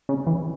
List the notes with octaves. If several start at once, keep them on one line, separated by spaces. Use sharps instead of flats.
C#3
E3